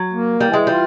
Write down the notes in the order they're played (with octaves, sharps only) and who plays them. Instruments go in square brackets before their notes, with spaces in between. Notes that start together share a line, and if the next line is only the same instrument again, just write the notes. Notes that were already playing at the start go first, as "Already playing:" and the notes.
Already playing: [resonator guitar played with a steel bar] F#3
[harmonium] A#3
[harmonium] E3 [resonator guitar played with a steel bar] G3
[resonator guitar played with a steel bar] G#3
[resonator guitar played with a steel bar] G3 [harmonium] F4